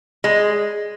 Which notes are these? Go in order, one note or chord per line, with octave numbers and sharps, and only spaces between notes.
G#3